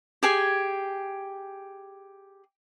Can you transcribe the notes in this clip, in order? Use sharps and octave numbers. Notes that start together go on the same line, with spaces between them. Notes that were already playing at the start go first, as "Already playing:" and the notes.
G4 G#4 G#5